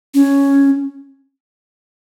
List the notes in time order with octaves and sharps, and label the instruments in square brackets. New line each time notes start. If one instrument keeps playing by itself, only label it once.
[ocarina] C#4